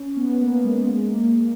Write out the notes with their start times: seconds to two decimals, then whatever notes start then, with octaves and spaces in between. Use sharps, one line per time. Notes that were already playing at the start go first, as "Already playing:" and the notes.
Already playing: C#4
0.17 B3
0.29 B3
0.40 A#3
0.64 G#3
0.89 G#3
1.04 A#3